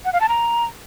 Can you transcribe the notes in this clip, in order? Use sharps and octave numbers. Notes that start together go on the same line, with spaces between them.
F#5
F5
A5
A#5